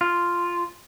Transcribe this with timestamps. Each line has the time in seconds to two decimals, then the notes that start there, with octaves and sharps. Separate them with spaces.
0.01 F4